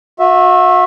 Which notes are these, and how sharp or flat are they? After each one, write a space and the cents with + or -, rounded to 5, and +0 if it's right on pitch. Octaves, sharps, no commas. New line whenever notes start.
F#4 -35 E5 +0